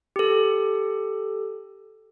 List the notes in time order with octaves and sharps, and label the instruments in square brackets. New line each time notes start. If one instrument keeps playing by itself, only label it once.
[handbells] G4 A4